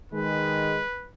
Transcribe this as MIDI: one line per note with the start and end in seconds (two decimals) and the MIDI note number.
0.12 0.78 51
0.12 0.78 56
0.12 1.10 71